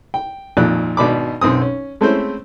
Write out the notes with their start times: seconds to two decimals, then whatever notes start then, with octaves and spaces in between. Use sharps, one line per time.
0.14 G5
0.57 G#1 F2 A#2 F#6
0.97 G#1 B2 D4 B5 D6
1.41 B1 F#2 C4 D#6
1.62 C#4
2.01 G#3 A3 C4 C#4 E4 C5